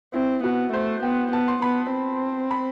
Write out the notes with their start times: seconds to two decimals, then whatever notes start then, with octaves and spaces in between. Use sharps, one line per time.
0.14 C4 E4
0.44 B3 F#4
0.73 A3 C5
1.03 B3 G5
1.32 B3 A5
1.48 C6
1.62 B3 B5
1.92 C4
2.51 B5